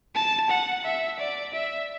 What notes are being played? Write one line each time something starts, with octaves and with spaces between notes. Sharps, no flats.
A5
F#5
E5
D5
E5